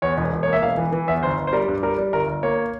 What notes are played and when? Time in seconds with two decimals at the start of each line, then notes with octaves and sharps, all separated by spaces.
0.02 E2 C#5
0.17 E1
0.33 E1
0.43 A#3 C#5
0.53 E5
0.62 E1 F5
0.77 E3
0.92 E3
1.08 E2 E5
1.23 G1 C5
1.37 G1
1.47 C5
1.53 G3 A#4
1.68 G2
1.83 G3 A#4
1.98 G3
2.13 G1 A#4
2.28 G1
2.43 A#3 C#5